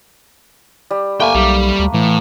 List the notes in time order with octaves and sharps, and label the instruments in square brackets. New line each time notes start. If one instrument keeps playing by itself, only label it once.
[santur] G3
[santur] A3 A#3 B4 [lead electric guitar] G5 G#5
[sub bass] B1 [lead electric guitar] G3
[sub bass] D2
[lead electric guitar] A2 [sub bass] E3